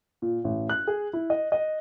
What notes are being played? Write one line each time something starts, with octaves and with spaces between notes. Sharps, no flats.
A#2
A1
F#6
G#4
E4
D#5
D#5